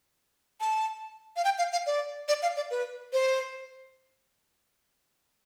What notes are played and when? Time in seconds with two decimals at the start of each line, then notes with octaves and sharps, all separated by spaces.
0.61 A5
1.36 F5
1.45 G5
1.58 F5
1.72 F5
1.86 D5
2.28 D5
2.42 F5
2.57 D5
2.71 B4
3.13 C5